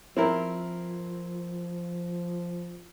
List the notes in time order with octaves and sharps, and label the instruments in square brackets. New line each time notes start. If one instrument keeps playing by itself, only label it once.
[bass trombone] F3 [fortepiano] C4 E4 A#4